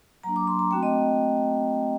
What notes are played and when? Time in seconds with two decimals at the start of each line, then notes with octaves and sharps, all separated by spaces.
0.23 F#3 A#3 D4 A#5
0.36 D6
0.47 C6
0.59 A#5
0.71 A3 C4 F#4 G5
0.83 D#5